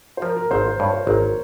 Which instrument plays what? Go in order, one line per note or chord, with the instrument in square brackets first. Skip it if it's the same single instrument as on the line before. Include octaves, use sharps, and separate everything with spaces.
[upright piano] C5
[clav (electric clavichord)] F3 [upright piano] A#4
[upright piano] A#4
[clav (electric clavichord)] G#1 [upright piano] C5
[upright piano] C5
[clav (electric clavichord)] G2 [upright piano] C#5
[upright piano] C5
[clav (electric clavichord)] G#1 [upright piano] A#4
[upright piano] A#4